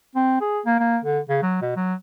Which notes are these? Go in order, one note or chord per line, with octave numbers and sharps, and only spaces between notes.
C4
G#4
A#3
A#3
D3
C#3
F#3
B2
F#3